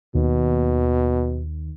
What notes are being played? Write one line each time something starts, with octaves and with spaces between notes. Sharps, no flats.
D#2 B2